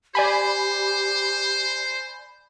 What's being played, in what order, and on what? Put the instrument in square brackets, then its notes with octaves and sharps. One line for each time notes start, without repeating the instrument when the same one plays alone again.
[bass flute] G4 [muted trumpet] C5 [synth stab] D5 G#5 B5